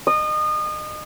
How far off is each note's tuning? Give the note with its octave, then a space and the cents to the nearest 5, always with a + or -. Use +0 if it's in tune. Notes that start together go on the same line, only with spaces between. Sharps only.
D#5 -30